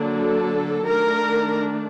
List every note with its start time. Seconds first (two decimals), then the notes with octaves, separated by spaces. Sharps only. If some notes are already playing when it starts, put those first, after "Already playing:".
Already playing: D3 F#3 A#3 D4
0.22 A4
0.87 D#3 A3 D4 A#4